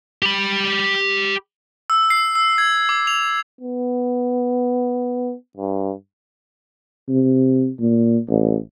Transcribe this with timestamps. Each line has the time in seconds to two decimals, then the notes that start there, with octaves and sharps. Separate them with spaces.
0.23 G4 B5
1.90 E6
2.10 C7
2.35 E6
2.58 G#6
2.89 D6
3.07 F7
3.61 B3
5.57 G2
7.09 C3
7.80 A#2
8.29 A1